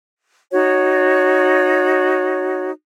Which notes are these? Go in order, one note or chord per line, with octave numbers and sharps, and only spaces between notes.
D#4 F#4 C#5